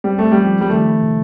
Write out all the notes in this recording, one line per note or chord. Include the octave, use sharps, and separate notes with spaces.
G3 C4
A3
G3
F3
G3
D#3 A3
C3